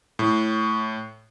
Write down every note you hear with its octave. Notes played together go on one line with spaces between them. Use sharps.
A2